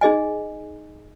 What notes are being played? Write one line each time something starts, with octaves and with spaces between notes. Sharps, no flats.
D#4 G#4 D#5 G#5